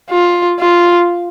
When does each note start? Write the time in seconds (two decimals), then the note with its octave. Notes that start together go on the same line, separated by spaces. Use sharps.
0.10 F4
0.60 F4